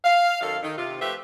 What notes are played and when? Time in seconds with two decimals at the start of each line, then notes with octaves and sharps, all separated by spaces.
0.05 F5
0.41 F#2 D#3 A4 F5
0.63 D#3
0.77 C3 F4
1.00 F3 A3 G4 B4 C5 E5